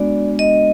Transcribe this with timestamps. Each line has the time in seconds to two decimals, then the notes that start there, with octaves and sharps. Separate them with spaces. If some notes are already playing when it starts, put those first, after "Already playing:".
Already playing: G#3 B3 D4 F#4 D5
0.39 D#5